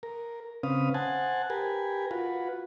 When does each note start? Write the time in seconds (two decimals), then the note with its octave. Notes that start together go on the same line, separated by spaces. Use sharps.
0.03 A#4
0.63 C#3 C4 C#4 B4 F5 D#6
0.94 C5 F#5 G#5 A5
1.50 G4 A#4 B4 G#5
2.11 F4 F#4 B4